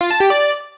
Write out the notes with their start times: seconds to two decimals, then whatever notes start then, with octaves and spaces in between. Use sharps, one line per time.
0.01 F4
0.11 A5
0.20 G4
0.30 D5